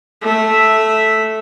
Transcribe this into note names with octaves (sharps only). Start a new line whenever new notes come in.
A3 E5